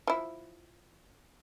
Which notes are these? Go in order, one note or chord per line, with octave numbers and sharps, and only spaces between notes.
F3 E4